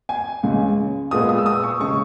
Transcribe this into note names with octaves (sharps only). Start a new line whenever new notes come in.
G#5
C#2 C#3 G#3
A#2 G#3 B3 D#6
D#6
E6
D#6
C#6
C#3 G#3 C#6